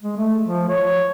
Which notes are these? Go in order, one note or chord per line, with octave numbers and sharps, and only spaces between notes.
G#3
A3
F3
C#5